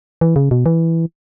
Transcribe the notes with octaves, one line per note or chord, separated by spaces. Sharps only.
E3
C#3
B2
E3